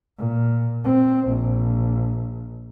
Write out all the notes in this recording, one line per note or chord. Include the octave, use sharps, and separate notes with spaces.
A#2
C4
A#1